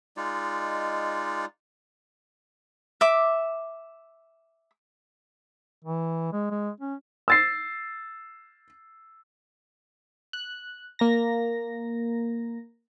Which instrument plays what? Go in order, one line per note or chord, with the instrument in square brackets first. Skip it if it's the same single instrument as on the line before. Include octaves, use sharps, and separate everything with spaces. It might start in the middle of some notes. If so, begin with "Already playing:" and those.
[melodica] G#3 D#4 F4 D5
[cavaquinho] E5 D6
[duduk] E3
G#3
G#3
C#4
[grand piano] E6 A6 C7
[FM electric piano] F#6
A#3 A#5 A#6